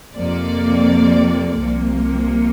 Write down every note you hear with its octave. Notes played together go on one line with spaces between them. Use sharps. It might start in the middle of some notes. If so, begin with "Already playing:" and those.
F2 C3 F3 A#3 D5
C2 C3 F3 A#3